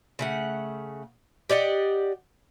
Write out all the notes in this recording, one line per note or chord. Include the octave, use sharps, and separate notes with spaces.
C#3 A3 F#5
G4 D5 D#5 F#5